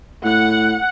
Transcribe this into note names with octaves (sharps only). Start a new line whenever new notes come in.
A2 F#5